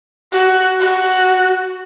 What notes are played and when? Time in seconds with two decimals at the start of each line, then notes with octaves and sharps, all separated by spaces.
0.32 F#4
0.80 F#4